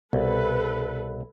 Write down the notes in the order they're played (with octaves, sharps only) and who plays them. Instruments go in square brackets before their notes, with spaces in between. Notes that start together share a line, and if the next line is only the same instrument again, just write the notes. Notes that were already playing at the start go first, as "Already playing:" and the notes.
[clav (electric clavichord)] C2 [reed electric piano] B2 [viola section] A4 B4